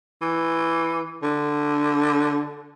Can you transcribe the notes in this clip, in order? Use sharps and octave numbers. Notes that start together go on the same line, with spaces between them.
E3
D3